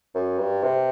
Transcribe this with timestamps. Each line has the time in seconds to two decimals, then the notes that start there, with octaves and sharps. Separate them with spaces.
0.15 F#2
0.39 G2
0.63 C3